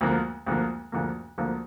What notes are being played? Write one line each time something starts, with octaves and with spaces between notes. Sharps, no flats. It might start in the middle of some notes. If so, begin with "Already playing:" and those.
D2 D3 F3 A#3
D2 D3 F3 A#3
D2 D3 F3 A#3
D2 D3 F3 A#3